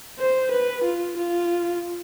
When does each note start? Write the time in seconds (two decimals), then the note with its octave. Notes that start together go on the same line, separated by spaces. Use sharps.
0.19 C5
0.52 B4
0.84 F4
1.17 F4